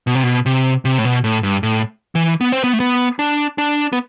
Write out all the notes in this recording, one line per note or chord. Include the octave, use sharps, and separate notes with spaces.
B2
C3
B2
C3
C3
A2
B2
A2
G2
A2
E3
B3
C4
B3
A3
B3
D4
D4
B3